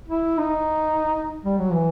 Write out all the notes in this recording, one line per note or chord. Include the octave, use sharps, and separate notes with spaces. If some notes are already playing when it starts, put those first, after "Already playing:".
E4
D#4
G3
F#3
E3